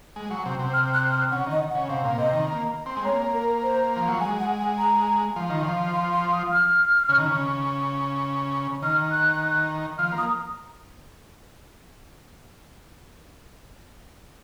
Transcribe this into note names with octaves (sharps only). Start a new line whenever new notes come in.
G#3
F#3
C3
C3
F6
F#6
F6
C#3 F#5
D#3 D#5
F#5
C#3
C3 F5
A#2
C3 D#5
D#3
A#3
C4
G#3
A#3 C#5
A#4
C5
F3
F#3
G#3 G#5
F#5
G#5
A#5
F3
D#3
F3
C6
C6
D#6
F6
C#3
D#3
C#3
D#3 F6
F#6
F3 F6
A#3
D#6